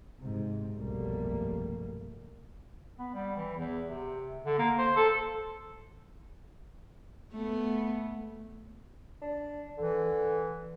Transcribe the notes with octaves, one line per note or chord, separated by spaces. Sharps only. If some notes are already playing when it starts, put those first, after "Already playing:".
G#2 C3
F1 B1 G2 G3 A3 A#3
B3
G3
E3
E2
C3
D3
A#3
C5
A4
A3 B3
D4
D3 E3